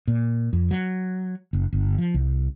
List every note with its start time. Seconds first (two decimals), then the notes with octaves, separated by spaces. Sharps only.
0.08 A#2
0.53 F2
0.71 F#3
1.53 F#1
1.73 G1
1.98 F3
2.14 C2